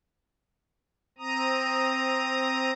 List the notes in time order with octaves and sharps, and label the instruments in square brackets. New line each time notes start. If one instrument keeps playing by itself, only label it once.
[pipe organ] C4 A#5 D#6